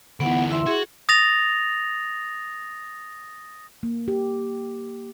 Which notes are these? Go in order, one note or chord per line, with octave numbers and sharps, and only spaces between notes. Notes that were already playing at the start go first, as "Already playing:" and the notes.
D2 E3 B3 F#5
E4 E5 C6
F#4 G#4
D#6 A6 A#6 F7
A#3
G4